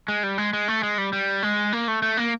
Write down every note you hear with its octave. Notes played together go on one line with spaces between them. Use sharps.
G#3
G3
G#3
G#3
A3
G#3
G3
G3
G#3
A#3
A3
A3
A#3